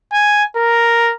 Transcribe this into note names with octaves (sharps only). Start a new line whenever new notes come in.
G#5
A#4